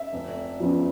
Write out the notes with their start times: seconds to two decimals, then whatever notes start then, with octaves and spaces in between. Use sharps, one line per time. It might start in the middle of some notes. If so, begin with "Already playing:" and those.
Already playing: E5
0.13 F1
0.60 E2 C#3 F3